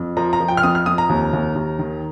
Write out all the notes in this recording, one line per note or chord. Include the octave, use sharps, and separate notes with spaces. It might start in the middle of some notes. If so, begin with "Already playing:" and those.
Already playing: F2
F3 A#5
A#5
F3
G5
F6
F2 D#6
F6
F2 D#6
A#5
D#2
D#2
D#2
D#3